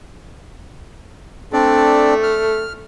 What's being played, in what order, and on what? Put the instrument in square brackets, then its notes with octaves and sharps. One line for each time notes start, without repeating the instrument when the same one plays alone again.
[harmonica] A3 [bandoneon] C4 D4 D5
[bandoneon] F6